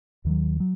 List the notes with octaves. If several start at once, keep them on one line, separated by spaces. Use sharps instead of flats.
D#2 D#3 F#3
F#3